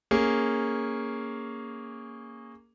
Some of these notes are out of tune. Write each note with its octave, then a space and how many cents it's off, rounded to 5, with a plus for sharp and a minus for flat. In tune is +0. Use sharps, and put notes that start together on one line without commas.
A#3 -5 C#4 +0 G#4 -10